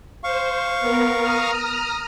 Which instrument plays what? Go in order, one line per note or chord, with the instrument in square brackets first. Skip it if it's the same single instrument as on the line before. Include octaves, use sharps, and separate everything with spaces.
[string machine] C5 [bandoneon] F5 C#6
[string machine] B3 A#4
A#5 D#6 F6